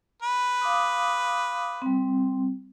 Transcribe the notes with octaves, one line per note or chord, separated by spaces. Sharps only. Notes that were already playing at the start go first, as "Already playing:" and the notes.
B4
F5 D6 D#6
G3 C4